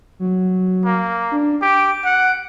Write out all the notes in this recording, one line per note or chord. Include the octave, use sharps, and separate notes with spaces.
F#3
A#3
D4
G4 D7
F#5